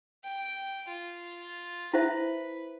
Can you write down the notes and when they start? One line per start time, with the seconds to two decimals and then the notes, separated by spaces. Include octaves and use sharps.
0.23 G5
0.88 F4
1.94 E4 B4 C5 E5